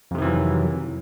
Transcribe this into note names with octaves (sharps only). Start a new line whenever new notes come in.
F2 C3 D#3 E3 F#3